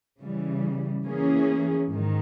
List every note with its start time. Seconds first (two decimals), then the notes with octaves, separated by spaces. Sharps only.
0.20 C#3 E3 G3
1.05 E3 A#3 C#4 G#4
1.90 G#2 D#3